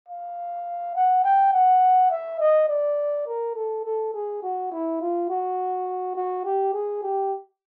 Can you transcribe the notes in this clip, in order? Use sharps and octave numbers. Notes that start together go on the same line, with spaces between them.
F5
F#5
G5
F#5
E5
D#5
D5
A#4
A4
A4
G#4
F#4
E4
F4
F#4
F#4
G4
G#4
G4